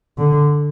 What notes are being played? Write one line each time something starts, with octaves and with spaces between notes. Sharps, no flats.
D3